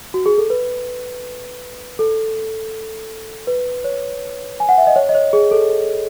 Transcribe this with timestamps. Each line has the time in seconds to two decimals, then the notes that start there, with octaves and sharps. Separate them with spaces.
0.14 F#4
0.26 G#4
0.38 A4
0.50 B4
1.99 A4
3.47 B4
3.84 C#5
4.60 G#5
4.69 F#5
4.78 E5
4.87 D#5
4.96 C#5
5.09 D#5
5.15 C#5
5.33 G#4
5.51 A4